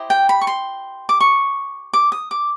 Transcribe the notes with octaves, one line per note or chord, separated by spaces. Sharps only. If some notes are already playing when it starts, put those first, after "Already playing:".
Already playing: E4 G4 C5 D#5
G5
B5
C#6
C6
D6
C#6
D6
D#6
D6